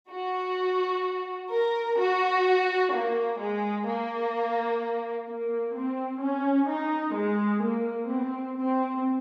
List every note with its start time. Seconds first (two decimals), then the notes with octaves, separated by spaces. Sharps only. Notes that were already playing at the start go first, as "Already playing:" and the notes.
0.10 F#4
1.51 A#4
1.99 F#4
2.93 A#3
3.39 G#3
3.87 A#3
5.28 A#3
5.75 C4
6.22 C#4
6.69 D#4
7.16 G#3
7.64 A#3
8.10 C4
8.58 C4